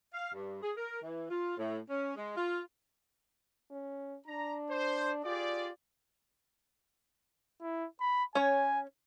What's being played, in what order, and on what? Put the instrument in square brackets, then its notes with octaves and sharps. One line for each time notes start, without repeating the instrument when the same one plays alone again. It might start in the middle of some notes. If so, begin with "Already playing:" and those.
[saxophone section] F5
G2
G#4
A#4
E3
F4
A2
C#4
G#3
F4
[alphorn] C#4
[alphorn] D4 [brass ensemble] A#5
[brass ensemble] C5
[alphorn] F4 [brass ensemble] G4 G#4 D5
[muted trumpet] E4
B5
[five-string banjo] C#4 C#5 [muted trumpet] G#5